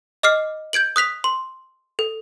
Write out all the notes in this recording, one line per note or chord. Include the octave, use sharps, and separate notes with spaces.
D#5 D6 F6 C7
G6 G#6 D7 F#7
D#6 F#6 B6 F7
C6
A4